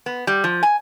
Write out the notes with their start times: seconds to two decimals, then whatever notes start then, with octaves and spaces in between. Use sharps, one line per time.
0.06 B3
0.27 G3
0.44 F3
0.63 G#5